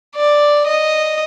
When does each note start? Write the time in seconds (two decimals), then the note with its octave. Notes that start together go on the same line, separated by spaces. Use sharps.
0.16 D5
0.67 D#5